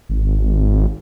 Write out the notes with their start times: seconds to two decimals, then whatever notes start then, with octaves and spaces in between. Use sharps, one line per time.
0.09 G#1